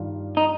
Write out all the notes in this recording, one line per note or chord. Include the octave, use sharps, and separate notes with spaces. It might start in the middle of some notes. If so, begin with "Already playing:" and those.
Already playing: G2 D#3 G3 D4 F4
D#4